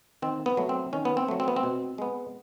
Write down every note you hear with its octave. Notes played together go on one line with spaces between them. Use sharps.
D#3 C4
B3
F#3 A3
C4
D#3 C#4
B3
C4
F#3 A3
C4
B3
C4
B2
G#3 B3